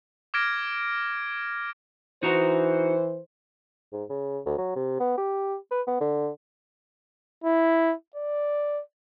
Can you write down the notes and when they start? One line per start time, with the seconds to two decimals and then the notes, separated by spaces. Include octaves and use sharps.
0.34 D6 F6 G#6 A#6 D7
2.23 E3 D#4 F#4 C5 A#5
3.92 G#2
4.09 C#3
4.46 D2
4.58 F#3
4.76 C3
5.00 B3
5.18 G4
5.71 B4
5.87 B3
6.01 D3
7.44 E4
8.15 D5